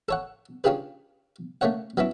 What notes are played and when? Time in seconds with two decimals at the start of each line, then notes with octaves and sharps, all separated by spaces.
0.09 A4 C#5 F#5
0.64 C#4 D4 F4 G4 G#4 B4
1.61 A3 A#3 C#4 C#5 F#5
1.97 F#3 B3 C#4 E4